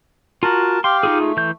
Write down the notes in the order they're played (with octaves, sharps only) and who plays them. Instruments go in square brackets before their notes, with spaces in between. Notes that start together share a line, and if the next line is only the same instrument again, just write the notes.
[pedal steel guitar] F4 F#4 [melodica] A#4 A5
[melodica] G4 F5 G5 [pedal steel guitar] C6
[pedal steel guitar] D#4 F4 G#4
[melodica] A3
[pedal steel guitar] E3 G6